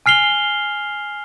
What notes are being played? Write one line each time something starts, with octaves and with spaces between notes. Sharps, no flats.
G#5 F6 C7 F7 G7